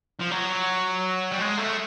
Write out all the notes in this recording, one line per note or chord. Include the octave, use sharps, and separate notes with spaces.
F3
F#3
G3
G#3
A3